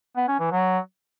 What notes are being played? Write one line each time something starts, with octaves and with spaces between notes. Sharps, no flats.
B3
C#4
E3
F#3